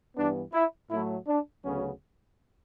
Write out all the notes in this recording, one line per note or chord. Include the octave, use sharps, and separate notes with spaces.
G2 E3 B3 D4
E4
A2 F#3 A3 E4
D4
D2 C#3 F#3 B3 C#4